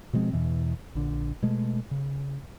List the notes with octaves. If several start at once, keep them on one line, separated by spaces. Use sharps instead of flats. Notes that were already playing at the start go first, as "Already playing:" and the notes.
B2 F3 G#3 C4
E2 B2 E3
A#1 D3
B2 G#3 A3
C#3